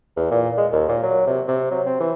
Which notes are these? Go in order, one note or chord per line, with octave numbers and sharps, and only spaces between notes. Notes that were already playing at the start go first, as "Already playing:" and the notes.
E2
A#2
G#3
D#2
A#2
F#3
C3
C3
F#3
C4
E3